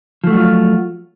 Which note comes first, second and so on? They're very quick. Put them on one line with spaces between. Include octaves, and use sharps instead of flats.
F3 A3 F#4 F#3 F4